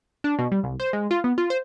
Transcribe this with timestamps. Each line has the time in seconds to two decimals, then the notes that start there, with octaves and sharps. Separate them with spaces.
0.24 D4
0.39 B2
0.52 G3
0.63 C2
0.80 C5
0.93 G#3
1.11 F4
1.24 B3
1.38 F4
1.50 C5